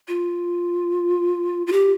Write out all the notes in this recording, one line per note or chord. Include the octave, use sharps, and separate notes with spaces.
F4
F4
G4